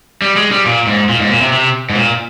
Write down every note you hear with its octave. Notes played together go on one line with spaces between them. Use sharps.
G3
G#3
G3
A#2
G#2
A#2
G#2
A#2
C3
C3
G#2
A#2